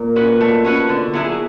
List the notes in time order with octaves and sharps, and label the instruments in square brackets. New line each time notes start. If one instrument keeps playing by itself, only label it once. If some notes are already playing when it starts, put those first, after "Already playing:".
Already playing: [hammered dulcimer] A#2
[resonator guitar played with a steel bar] C#4 F#4 B4
[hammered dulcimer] B2 [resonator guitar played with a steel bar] A3
[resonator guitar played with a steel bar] C#4 F#4 B4
D3
F#3 B3 E4 G#4